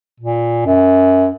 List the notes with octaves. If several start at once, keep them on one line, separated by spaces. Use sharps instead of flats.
A#2
F#2